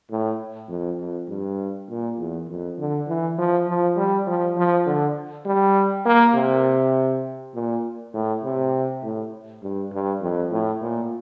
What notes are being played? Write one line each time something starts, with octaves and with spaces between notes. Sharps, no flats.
A2
F2
F2
G2
A#2
E2
F2
D3
E3
F3
F3
G3
F3
F3
D3
G3
A#3
C3
A#2
A2
C3
A2
G2
G2
F2
A2
A#2